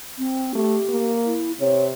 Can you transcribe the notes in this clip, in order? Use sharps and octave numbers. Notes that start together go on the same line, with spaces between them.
C4
A3 G4
A#3
E4
C3 C#5